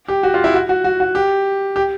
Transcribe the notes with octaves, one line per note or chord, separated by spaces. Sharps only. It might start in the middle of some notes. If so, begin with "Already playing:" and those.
G4
F#4
F4
E4
F#4
F#4
F#4
F#4
G4
G4